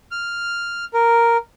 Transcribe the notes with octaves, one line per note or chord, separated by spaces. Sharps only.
F6
A#4